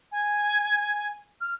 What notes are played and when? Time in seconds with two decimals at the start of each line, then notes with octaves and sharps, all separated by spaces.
0.11 G#5
1.40 F6